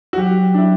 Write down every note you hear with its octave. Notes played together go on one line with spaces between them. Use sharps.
F#4
F#3 G4
D4
E4